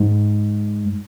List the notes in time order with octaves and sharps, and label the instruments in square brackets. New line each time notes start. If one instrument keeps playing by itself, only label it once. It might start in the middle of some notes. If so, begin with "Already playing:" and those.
Already playing: [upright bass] G#2